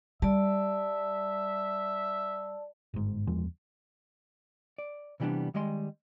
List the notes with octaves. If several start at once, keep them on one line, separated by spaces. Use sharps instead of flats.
G3 D5 E5 A5
G1 G#2
F#1 E2 F3 G#3
D5
C3 E3 G3 B3 D4
D#3 G3 G#3 D#5 C6